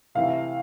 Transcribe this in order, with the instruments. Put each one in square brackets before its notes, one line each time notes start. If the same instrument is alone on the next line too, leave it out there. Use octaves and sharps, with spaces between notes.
[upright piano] C3 E3 A3 F5